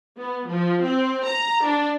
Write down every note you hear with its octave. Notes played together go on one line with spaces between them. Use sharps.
B3
F3
C4
A#5
D4